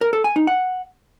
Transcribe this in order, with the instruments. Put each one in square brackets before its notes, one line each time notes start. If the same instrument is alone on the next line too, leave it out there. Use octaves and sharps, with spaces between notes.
[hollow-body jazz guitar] A#4
A4
G#5
D#4
F#5